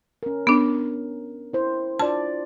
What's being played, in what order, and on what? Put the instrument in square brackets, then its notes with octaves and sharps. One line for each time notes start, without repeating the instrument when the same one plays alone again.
[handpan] C#4 A#4
[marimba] B3 D4
[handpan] E4 C5
[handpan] D4 F4 D5 [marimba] A5